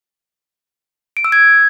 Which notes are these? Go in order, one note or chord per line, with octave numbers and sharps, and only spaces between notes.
D7
E6
G#6